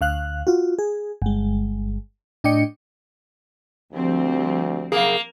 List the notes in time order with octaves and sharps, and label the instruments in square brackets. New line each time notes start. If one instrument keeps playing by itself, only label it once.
[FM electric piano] D2 F5 F#6
F4 F#4
G#4
G1 G#3
A2 D4 D#5 G5 D6 C#7
[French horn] D2 [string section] F3 G3 C4
[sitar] A#3 [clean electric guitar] G#4 A#4 F5